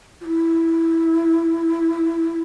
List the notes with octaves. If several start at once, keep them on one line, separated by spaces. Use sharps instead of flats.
F4
E4